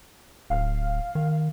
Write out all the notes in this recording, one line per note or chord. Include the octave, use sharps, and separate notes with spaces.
D1 F5
D#3